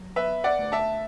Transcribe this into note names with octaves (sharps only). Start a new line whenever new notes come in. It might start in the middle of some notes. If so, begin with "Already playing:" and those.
Already playing: F#3
B3 B4 E5
D5 F#5
D2
E5 A5